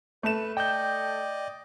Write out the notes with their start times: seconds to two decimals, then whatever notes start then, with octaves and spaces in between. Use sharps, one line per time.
0.23 A3 B4 E7
0.57 D5 D#5 G5 G6